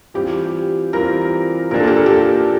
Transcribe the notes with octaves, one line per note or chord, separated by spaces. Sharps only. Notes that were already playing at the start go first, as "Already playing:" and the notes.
E3 G3 C4 F4 G4
E3 G3 C4 F4 A#4
A#2 F3 A#3 D4 F4 A#4
A4
G4
A4
G4
A4